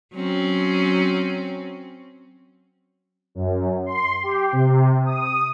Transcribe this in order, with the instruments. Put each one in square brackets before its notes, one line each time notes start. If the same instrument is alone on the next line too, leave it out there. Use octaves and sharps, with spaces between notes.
[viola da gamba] F#3 C4 C#4
[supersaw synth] F#2
C6
G4
C3
D#6